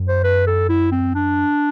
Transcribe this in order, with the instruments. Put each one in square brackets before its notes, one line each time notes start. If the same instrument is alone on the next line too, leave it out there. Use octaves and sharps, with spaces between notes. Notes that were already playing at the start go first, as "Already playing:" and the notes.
Already playing: [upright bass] F#2
[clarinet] C5
B4
A4
E4
C4
D4